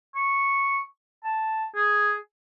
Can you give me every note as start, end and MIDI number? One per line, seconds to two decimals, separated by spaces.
0.15 0.81 85
1.24 1.66 81
1.75 2.15 68